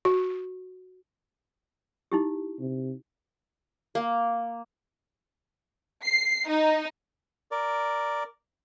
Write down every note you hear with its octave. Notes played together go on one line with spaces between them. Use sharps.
F#4
D#4 E4 G4
C3
A#3
C7
D#4
A#4 D5